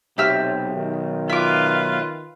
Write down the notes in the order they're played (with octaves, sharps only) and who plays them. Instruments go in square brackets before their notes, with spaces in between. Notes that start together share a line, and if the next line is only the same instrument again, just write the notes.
[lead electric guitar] B1 [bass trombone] C3 [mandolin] G4 E5 F6
[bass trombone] D#3
[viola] F4 B4 [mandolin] E5 D6